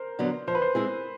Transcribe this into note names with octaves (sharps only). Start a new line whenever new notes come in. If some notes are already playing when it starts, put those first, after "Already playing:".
Already playing: A#4 C5
D3 F#3 B3
F3 C5
B4
C5
G#3 C4 E4 G#4